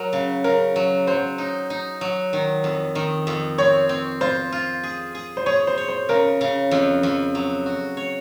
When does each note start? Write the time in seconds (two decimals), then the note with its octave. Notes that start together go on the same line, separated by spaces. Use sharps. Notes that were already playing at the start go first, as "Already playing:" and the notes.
Already playing: F#3 A#4
0.13 C#3
0.44 C#3 A#4
0.76 F#3
1.07 F#3 C5
1.38 D#4
1.70 D#4
2.01 F#3
2.33 D#3
2.64 F2
2.95 D#3
3.27 F2
3.58 C4 C#5
3.89 C4
4.21 F4 C5
4.52 F4
4.83 G#4
5.15 G#4
5.37 C5
5.46 G#4 C#5
5.67 C5
5.78 C#5
5.88 C5
6.09 C#3 A#4
6.41 C#3
6.71 F2
7.03 F2
7.35 F#3
7.66 F#4
7.97 C#5